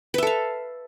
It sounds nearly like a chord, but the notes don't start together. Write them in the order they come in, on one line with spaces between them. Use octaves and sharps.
B4 E5 A4 F5